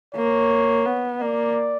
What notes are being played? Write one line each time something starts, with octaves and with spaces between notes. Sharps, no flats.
A#3 C#5
B3
A#3 D5